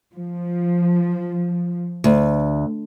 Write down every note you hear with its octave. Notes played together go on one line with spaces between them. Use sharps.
F3
D2